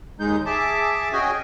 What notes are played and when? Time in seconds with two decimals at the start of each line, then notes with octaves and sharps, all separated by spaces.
0.20 D#2 G#3 D#4 G6
0.46 G#4 E5 A5 D6
1.13 C#4 F#4 G#4 D#5 G5 G#5